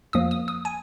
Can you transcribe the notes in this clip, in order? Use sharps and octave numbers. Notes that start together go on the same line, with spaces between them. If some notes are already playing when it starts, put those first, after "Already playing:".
F2 F3 A#3 D#6
D#6
D#6
G#5